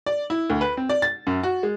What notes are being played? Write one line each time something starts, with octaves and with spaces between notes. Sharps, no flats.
D5
E4
D2
B4
C4
D5
A6
F#2
F#4
G#3